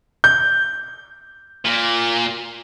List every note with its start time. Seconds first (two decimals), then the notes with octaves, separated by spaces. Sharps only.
0.24 G6
1.65 A#2